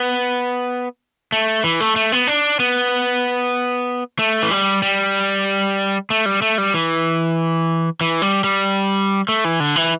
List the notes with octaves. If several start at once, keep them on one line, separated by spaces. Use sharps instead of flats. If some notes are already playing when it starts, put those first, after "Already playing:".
Already playing: B3
A3
E3
A3
A3
B3
D4
B3
A3
E3
G3
G3
A3
G3
A3
G3
E3
E3
G3
G3
A3
E3
D3
E3